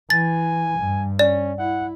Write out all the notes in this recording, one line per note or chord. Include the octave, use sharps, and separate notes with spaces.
E3 G#5 A6
G2
C#4 D5
E4 F#5